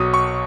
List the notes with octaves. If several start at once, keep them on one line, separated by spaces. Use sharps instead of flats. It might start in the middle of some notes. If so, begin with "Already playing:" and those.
Already playing: B1 B2 F#3 C#6 D#6
C#6